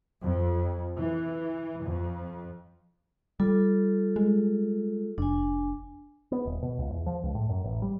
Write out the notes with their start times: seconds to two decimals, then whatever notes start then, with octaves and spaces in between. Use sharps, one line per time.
0.22 F2
0.96 E3
1.85 F2
3.40 G3 F4 A4
4.16 G#3
5.18 F1 D4 G#5
6.32 B3
6.45 D#1
6.62 B2
6.79 C#2
6.92 E2
7.06 F3
7.23 C#2
7.35 A2
7.49 F#2
7.64 A1
7.82 G3